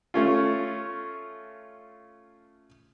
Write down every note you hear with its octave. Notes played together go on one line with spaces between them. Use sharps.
A3 C#4 F4